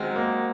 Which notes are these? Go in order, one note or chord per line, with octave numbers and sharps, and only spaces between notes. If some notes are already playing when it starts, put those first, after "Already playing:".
Already playing: D#3 F#3 G#3 C4
A#3